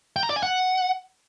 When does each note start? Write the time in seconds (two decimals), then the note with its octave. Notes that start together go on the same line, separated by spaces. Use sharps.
0.16 G5
0.23 A#5
0.30 D5
0.36 G#5
0.43 F#5